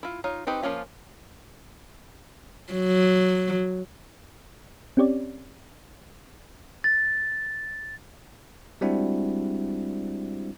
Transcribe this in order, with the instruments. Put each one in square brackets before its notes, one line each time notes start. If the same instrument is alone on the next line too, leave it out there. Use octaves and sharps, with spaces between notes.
[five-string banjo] E4 F4
D#4 F4 C#5
C4 D#4 G4 B4
F3 G#3 A#3 C#4 F4
[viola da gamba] F#3
[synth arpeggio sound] C4 C#4 G4 C#5 D5
[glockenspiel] A6
[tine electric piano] G3 G#3 C4 D4 E4 F#4